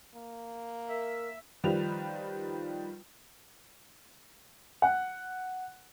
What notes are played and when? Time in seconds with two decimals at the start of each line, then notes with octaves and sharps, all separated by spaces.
0.15 A#3
0.89 A#4 E5
1.64 D#3 F3 G3 B4 F7
4.82 F#5